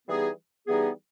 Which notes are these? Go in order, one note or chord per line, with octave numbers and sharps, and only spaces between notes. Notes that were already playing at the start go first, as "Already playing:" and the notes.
E3 G3 B3 D#4 G#4
E3 G3 B3 D#4 G#4